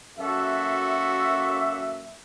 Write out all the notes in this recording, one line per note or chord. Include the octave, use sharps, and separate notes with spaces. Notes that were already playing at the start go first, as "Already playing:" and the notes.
F#2 A#3 F#4 A4 E5